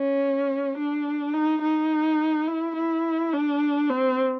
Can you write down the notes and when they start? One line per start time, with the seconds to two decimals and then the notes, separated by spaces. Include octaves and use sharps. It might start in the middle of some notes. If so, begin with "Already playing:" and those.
Already playing: C#4
0.78 D4
1.33 D#4
1.62 D#4
2.47 E4
2.76 E4
3.33 D4
3.89 C4